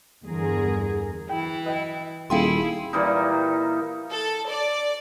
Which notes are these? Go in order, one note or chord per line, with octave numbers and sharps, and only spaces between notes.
E2 G2 D3 G#4 A#4
E3 E4 G5
B4 D#5 G5
D#1 E4 G#4 A4 F5 G5 C6
A#2 E3 G3 D#4
A4
D5